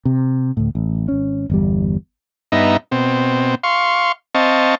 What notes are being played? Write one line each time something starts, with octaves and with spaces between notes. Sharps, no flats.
C3
D2 A2
A1
G#1 C#4
G1 E2 G3
G2 B3 D#4 E5 A#5
B2 C4
F5 C6 C#6
C4 D#5 F5 A5 C#6